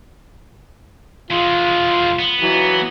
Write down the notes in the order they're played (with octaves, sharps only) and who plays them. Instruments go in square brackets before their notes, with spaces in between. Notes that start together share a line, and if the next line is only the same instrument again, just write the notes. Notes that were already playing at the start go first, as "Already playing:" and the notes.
[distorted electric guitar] E2 G#3 [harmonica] F4
[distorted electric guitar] B3
[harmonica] E3 F#3